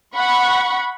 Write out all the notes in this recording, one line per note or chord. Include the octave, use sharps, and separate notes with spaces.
F#5 B5 C#6